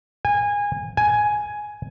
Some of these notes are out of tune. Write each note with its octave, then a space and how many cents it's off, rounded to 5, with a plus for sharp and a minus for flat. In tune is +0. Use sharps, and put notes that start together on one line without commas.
G#5 -25
G#5 +5